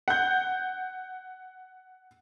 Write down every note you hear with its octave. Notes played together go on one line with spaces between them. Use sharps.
F#5 G6